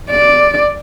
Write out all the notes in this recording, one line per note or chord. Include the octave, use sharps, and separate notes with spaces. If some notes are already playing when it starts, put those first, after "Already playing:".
D5